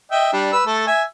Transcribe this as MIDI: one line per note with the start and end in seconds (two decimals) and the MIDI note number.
0.11 0.31 75
0.11 0.31 76
0.11 0.31 79
0.33 0.52 55
0.33 0.52 62
0.53 0.65 71
0.53 0.65 88
0.66 0.87 57
0.66 0.87 69
0.87 1.03 76
0.87 1.03 80